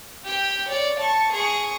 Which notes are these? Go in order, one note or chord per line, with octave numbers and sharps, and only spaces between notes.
G4 G5
C#5 D5
A5 C#6
G#4 C#6